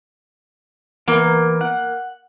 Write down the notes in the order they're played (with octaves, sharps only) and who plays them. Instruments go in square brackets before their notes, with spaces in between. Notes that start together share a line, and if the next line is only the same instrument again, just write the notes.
[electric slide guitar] E3 B3 A#4 [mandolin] A#3
[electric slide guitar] F#5